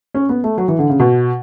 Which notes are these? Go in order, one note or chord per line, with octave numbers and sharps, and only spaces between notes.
C#4
B3
A3
F#3
E3
D3
C#3
B2